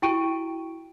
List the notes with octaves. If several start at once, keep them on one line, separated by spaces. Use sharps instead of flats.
E4 F#4 G5 C#6 D7 D#7